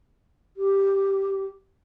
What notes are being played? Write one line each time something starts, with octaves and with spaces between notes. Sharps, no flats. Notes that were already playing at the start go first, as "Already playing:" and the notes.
G4